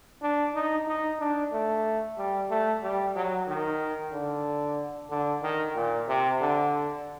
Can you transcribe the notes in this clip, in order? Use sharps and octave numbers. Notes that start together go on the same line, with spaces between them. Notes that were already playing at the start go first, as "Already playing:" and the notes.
D4
D#4
D#4
D4
A3
G3
A3
G3
F#3
D#3
D3
D3
D#3
A#2
C3
D3